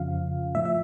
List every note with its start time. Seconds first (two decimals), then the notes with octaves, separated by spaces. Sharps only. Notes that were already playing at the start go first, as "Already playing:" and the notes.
Already playing: F2 C#3 F3 F5
0.55 A2 F3 E5
0.65 E5